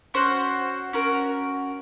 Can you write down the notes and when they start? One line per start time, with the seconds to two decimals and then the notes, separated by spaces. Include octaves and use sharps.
0.14 C#4 F#4 C5
0.93 C#4 F#4 A#4